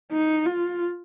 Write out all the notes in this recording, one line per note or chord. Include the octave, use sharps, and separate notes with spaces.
D#4
F4